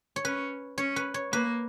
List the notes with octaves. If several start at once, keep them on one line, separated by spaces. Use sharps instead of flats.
C#5
C#4 B4
C#4 C#5
B4
C#5
A#3 B4